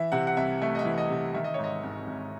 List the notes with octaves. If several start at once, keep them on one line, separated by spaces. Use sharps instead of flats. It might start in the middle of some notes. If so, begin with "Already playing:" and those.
Already playing: E3 E5
C3 F#5
F#5
C2 E5
A3 E5
D#5
E5
E3
D#5
C3
D#3 E5
D#5
G#2 C#5
D#5
G#1
G#1